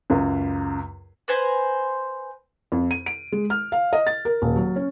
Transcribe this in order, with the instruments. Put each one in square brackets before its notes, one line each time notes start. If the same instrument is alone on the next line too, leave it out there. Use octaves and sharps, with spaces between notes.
[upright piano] C#2 F#2
[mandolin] B4 C5 G#5 A#5
[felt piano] F2
D#7
D7
G#3
F6
F5
D#5
A6
A#4
D#1
F#3
C#4